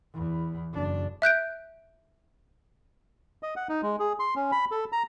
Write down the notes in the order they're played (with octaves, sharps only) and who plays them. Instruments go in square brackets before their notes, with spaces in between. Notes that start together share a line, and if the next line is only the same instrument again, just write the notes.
[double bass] E2
F#1 D4
[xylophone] E5 F#6 G6 D7
[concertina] D#5
F#5
D#4
G#3
G#4
C6
C#4
B5
A4
A#5